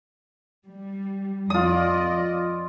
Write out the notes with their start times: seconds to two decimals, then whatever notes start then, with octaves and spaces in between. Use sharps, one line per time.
0.67 G3
1.50 F2 F4 D5 D#5 D#6